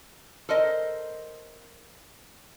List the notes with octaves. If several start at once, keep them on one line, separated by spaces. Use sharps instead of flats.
A4 A#4 C5 D#5